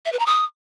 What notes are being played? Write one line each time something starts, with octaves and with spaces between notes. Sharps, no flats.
E5
B4
A#5
D#6